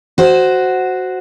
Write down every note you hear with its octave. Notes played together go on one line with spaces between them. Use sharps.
F#4 C5